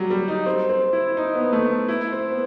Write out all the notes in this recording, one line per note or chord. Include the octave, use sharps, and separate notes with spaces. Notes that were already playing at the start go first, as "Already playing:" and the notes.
Already playing: F#3 G3
G3
D#4
C4
C4
E4
D#4
B3
A3
B3
E4
C4
B3